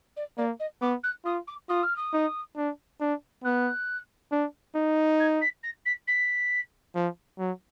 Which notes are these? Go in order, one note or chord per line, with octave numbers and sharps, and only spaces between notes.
D5
A#3 D5
D#5
B3 D6
F#6
F4 D#6
D6
F4 D#6
F6
D#6
D#4
D4
D4
B3 F#6
D4
D#4
G#6
B6
A#6
B6
B6
F3
F#3